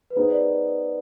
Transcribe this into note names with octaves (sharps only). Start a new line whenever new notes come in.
B4
B3 D#4 G#4 C5
D5